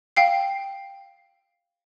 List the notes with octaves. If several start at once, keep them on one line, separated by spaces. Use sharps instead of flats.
F5 G5 C7